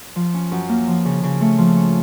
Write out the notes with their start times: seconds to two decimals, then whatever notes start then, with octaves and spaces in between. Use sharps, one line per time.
0.16 F3
0.34 C#4
0.51 F#2
0.69 A#3
0.87 F3
1.05 C#3
1.23 C#3
1.41 A3
1.58 F3
1.76 C#4